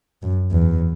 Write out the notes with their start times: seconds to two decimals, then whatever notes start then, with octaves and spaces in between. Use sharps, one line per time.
0.23 F#2
0.51 E2